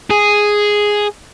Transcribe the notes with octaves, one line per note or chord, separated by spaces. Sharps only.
G#4